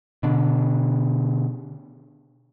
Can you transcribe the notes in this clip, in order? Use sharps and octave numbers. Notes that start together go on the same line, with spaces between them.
B2 D3